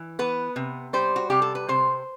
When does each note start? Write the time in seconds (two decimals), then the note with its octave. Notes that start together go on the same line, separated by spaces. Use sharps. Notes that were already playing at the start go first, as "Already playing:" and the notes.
Already playing: E3
0.19 B3 B4
0.56 C3
0.93 G3 C5
1.16 F#4
1.30 C3 G4
1.42 A4
1.55 B4
1.68 C3 C5